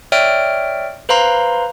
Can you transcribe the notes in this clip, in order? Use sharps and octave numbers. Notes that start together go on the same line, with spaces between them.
C#5 D5 E5 G5 F6 D7
B4 C5 F5 A#5 C6